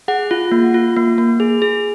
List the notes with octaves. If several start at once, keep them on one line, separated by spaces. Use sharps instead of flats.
G#4 F#5
F4
A#3
F4
A#3
A#3
G#4
G#4